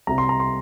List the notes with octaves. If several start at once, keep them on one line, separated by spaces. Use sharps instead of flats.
C2 C3 G3 A#5
C6
A#5
C6